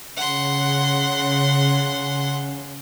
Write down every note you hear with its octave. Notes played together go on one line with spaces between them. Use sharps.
C#3 F#5 C6